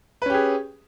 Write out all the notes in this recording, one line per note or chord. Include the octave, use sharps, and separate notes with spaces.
C#4 G4 G#4 B4